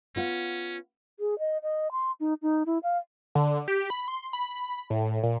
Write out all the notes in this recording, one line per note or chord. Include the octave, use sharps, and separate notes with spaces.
B3 C#4 F4 F#5
G#4
D#5
D#5
C6
D#4
D#4
E4
F5
D3
G4
B5
C6
B5
A2
A#2